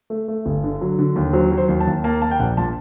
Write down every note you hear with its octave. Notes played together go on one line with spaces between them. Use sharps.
A3
A3
G1
D3
F#3
D3
D#2
F#3 C5
F#3
C5
D#2
A5
D#2
A#3 A5
A#3 A5
G5
A#1 F#5
A#2 A5